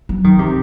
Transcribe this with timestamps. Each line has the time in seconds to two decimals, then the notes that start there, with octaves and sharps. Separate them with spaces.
0.09 F#3
0.24 D#3
0.39 C3